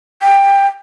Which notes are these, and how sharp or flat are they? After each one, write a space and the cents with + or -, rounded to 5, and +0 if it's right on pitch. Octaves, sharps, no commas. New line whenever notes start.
G5 +15